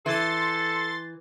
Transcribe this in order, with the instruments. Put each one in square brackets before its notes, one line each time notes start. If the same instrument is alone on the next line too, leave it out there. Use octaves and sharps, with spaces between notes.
[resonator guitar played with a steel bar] E3 [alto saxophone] A4 [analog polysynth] C6 A6